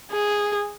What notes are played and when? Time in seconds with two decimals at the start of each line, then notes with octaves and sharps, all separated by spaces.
0.12 G#4